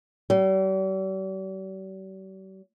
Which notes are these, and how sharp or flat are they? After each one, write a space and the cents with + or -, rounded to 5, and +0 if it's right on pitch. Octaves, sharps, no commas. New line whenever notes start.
G3 -45